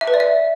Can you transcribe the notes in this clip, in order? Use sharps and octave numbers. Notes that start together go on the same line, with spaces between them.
E5
B4
D5
E5